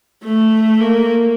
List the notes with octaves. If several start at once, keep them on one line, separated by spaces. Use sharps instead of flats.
A3
A#3